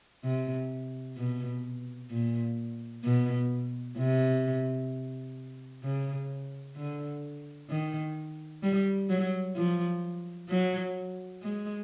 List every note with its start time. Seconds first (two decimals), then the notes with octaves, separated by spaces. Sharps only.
0.24 C3
1.17 B2
2.11 A#2
3.04 B2
3.97 C3
5.84 C#3
6.76 D3
7.70 D#3
8.63 G3
9.10 F#3
9.56 F3
10.50 F#3
11.42 G#3